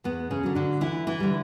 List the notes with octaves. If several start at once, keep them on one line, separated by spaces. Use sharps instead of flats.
E2 B3
C#3 C#4
D3 F#3
D3 D4
D2 E3 E4
E3 E4
D3 G3